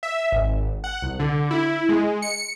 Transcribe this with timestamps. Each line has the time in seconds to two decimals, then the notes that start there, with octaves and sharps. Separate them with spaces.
0.03 E5
0.32 G#1
0.84 F#5
1.02 C2
1.19 D3
1.51 E4
1.89 G#3
2.22 C#7